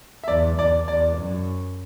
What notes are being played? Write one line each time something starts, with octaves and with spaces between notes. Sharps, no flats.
E5
E2 D5
E2 D5
E2 D5
F#2